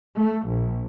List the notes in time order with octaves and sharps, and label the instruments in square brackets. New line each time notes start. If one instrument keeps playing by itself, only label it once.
[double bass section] A3
A#1